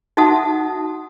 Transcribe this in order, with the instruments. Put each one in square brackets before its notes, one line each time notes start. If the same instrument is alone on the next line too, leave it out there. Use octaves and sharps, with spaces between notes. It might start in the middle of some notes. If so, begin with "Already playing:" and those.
[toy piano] D#4 F#4 E5 F#5 A5 D#6